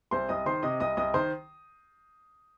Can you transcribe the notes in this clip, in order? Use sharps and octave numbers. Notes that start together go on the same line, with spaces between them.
C2 C5 C6
C2 D#5 D#6
D#3 C5 C6
C3 D#5 D#6
C2 D#5 D#6
C2 D#5 D#6
D#3 C5 C6